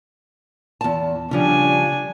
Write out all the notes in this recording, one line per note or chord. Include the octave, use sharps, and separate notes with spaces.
E2 A5
C#3 F3 G3 D4 G#5